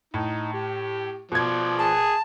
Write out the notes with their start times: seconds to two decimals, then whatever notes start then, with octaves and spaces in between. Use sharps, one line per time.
0.14 A2 D#4
0.53 G4
1.32 B2 F3 D5 G#6
1.79 G#4 A5